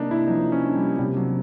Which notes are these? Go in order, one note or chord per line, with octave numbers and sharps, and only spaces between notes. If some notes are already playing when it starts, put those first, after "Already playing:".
Already playing: C3 A#3 D4 D#4
E4
F3 D#4
C#4
D4
G3
C3 G3
F#3